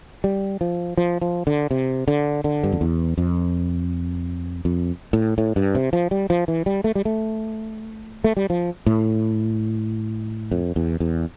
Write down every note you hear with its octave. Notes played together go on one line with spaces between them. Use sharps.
G3
F3
F3
F3
D3
C3
D3
D3
G2
F2
E2
F2
F2
A2
A2
G2
C3
F3
G3
F3
E3
G3
A3
G3
A3
A3
G3
F3
A2
F2
E2
E2